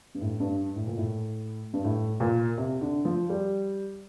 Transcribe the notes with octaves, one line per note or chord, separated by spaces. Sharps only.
G2
A2
G2
A2
A#2
A2
G2
A2
A#2
C3
D3
F3
G3